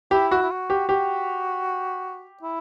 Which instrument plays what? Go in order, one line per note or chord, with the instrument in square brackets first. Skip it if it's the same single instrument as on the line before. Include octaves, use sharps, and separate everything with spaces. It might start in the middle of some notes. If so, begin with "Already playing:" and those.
[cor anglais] E4 [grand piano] G4
[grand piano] F#4
[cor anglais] E4
F#4
[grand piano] G4
[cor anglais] F#4 [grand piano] G4
[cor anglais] E4